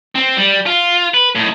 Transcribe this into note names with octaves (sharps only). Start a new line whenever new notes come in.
C4
G3
F4
B4
A2 D#4